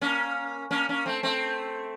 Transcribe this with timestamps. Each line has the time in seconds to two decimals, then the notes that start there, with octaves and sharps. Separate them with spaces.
0.01 A#3 C#4
0.71 A#3 C#4
0.89 A#3 C#4
1.06 A3 C4
1.23 A3 C4